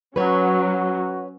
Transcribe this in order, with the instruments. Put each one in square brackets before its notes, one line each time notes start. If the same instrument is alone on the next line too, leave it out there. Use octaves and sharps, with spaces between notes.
[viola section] F#3 C#4 [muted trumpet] F#4 [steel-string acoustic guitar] B4 C#5